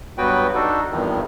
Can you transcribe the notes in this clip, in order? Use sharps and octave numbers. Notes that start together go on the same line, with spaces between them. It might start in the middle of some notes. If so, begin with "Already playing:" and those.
G2 F#3 B3 F#4 B4 G5
D4 D#4 F#4 A4
E2 G2 C3 D#3 F3